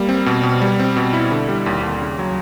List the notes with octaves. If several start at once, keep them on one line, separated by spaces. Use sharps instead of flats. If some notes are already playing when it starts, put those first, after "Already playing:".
Already playing: G3 A#3
C4
B2
B2
G3
C4
B2
E4
D3
G3
D#2
D#2
C#3
F#3